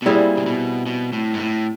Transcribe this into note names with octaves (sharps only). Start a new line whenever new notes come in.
B2
A#2 G3 C4 E4 G#4
C3
B2
B2
A2
G#2
A2